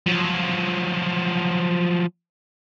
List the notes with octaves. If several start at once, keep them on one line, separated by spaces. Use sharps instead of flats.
F3 F#3